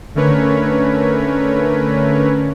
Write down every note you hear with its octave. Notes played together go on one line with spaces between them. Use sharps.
D3 A3 C#4 A#4 B4 C#5